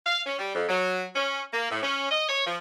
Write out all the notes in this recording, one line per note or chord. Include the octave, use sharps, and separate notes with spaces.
F5
C#4
G3
F2
F#3
C#4
A#3
A2
C#4
D#5
C#5
F3